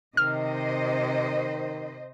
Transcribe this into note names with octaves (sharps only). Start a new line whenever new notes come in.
C3 D#3 C5 D#5 F6